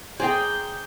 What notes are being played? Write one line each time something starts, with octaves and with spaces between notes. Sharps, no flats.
G#4 C5 D5 G5 A#5 G6